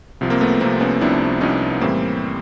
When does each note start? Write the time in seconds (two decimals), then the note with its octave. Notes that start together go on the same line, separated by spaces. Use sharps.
0.21 C2 C3 F3
0.30 A#3 C4
0.41 A3 B3
0.61 C2 C3 F3 A#3 C4
0.80 B3 C#4
1.01 C2 C3 F3 D4 E4
1.41 C2 C3 F3 C#4 D#4
1.80 A2 E3 G3 A#3 C4